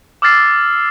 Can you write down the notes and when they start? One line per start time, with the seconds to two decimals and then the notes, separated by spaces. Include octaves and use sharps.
0.22 D6 E6 F6 A6 C7